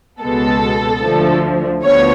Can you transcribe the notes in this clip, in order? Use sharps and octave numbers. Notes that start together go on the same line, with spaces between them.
C#2 B2 G#3 B3 A4
D2 D3 F3 A3
D2 D3 F3 B3 C#5